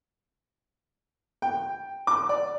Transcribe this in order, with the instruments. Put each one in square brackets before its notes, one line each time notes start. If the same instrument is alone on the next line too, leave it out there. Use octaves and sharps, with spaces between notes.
[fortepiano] G5
D6
D5